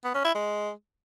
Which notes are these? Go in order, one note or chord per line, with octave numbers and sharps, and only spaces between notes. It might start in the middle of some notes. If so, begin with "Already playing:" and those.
B3
C#4
E4
G#3